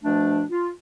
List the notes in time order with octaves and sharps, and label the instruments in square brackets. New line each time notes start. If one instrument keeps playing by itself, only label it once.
[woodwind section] B2 F3 A3 D4
F4